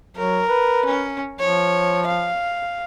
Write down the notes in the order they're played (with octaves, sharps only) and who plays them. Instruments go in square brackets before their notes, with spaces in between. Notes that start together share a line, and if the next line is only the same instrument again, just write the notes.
[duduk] F#3 [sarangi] A#4
[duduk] B4
[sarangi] C#4
[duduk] F3 [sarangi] C#5
[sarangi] F5